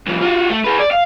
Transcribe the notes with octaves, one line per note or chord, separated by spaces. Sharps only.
C2 F3
F4 F#4
A3
G#4 B4
D5
F5